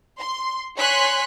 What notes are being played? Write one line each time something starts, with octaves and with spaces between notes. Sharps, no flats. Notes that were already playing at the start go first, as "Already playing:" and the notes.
C6
C#5 G#5 C6 F#6 B6